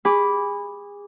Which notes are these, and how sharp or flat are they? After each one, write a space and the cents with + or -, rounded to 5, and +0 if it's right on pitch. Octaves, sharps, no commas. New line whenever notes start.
G#4 -30 B5 +0 D6 -15